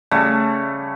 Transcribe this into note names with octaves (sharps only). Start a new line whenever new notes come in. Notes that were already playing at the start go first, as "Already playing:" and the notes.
C#3 G3 A3